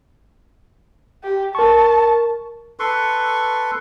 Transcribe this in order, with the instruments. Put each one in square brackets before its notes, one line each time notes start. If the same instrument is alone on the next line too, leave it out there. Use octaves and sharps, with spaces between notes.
[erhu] G4
[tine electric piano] A#4 C#6 [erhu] A5
[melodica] A4 B4 C6 C#6